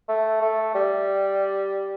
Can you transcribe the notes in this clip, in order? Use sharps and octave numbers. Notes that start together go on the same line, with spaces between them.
A3
A3
G3